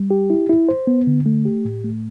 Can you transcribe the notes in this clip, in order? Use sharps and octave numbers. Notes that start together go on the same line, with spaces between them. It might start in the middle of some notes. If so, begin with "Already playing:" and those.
Already playing: G3
G4
E4
E4
C5
B3
D3
A3
G4
A2
A3